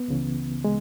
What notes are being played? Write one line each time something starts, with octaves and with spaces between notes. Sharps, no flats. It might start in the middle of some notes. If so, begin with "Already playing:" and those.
Already playing: B3
C#2 C#3 E3
G#3